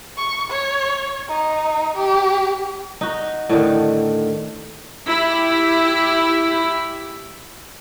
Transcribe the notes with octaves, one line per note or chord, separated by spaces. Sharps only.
C#6
C#5
D#4
G4
D#4 F#4
A2 D3 D#3
E4 G4